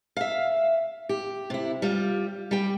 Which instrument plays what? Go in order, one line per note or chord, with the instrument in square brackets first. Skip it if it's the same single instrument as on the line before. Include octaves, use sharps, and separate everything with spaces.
[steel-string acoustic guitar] E5 F5
G4
C3 E4
G3 F4
G3 G5